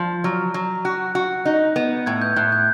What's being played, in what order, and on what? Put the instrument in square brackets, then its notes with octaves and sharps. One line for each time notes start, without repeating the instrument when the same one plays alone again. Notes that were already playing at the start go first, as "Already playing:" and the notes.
Already playing: [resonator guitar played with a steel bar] F3
[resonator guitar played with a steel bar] F#3 [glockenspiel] F6
[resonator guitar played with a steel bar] F#3
[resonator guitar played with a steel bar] F#4 [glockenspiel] F#6
[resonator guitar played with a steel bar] F#4
D#4
B3
[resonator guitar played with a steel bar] A2 [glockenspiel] G#6
[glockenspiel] G6
[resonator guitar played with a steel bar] A2 [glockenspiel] F#6
[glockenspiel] G6